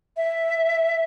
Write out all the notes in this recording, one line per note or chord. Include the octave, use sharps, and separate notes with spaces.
E5